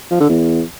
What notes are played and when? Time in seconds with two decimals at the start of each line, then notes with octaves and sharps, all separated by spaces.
0.11 F3
0.20 D3
0.29 E2